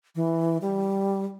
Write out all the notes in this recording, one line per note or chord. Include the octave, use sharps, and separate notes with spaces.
E3
G3